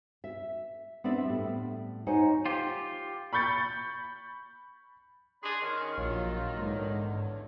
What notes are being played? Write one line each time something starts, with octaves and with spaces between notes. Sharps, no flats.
E5
B3 C4 D4 D5 E5
A2 G3
D#4 C5 C#5 F#5 G#5
F4 G4
B5 C#6 G6 A6 C#7
D4 G#4 D5 B5 C6 F#6
D#3 C#4 C#6
A#1 F#3 F4 C#5
E2 G#2 D3